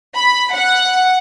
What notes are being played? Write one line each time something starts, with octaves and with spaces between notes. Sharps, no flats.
B5
F#5